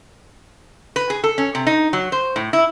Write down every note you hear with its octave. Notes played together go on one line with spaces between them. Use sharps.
B4
G#4
A4
C#4
C3
D#4
F#3
C5
A2
E4